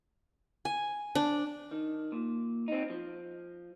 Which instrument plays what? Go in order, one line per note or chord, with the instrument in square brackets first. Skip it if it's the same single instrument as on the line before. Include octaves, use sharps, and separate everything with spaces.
[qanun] G#5
D4
[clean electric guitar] D#3
A#2
C4 D#4
F3